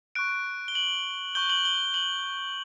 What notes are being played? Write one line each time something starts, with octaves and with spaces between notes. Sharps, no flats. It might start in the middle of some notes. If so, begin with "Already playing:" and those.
C#6 F#6 D7
G7
F#7
C#6 G6 G7
F#7
G7
F#7